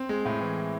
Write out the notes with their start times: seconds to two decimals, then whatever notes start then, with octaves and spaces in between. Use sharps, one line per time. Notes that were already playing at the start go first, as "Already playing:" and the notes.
Already playing: C4
0.09 G#3
0.25 A2
0.41 E3